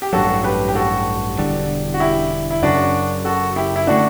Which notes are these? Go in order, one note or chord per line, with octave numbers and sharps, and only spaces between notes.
G4
A1 G2 F#3 F#4 A4
G4 B4
G4
F#4 A4
E1 E2 D3 G3
F#4
E4 G4
E4
F#1 F#2 C#3 F#3 D4 F#4
F#4 A4
E4 G4
E4
D3 A3 D4 F#4